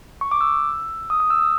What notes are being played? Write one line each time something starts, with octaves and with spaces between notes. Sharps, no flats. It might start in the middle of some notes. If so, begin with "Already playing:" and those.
C#6
D6
E6
D#6
D#6
E6
D#6